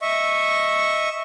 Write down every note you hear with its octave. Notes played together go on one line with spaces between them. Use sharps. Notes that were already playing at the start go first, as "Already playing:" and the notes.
D#5 E5 C#6